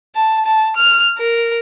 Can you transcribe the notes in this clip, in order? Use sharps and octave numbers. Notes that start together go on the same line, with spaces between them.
A5
A5
F6
A#4